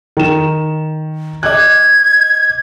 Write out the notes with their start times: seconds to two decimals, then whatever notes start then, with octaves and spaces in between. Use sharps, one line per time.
0.17 D#3 E7
1.43 D#5 D6 F#6 G#6